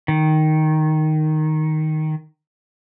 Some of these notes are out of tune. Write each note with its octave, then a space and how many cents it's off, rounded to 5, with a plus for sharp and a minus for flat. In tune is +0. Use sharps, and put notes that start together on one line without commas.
D#3 +0